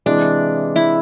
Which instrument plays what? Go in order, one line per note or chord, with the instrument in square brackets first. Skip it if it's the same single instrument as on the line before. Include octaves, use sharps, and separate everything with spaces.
[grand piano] C3 E3 G#3 [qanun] D4
[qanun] E4